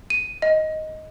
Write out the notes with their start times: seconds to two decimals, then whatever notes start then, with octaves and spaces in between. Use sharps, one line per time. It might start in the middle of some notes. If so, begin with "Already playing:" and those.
0.10 D#7
0.42 D#5